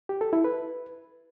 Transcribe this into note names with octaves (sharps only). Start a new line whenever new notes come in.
G4
A4
E4
B4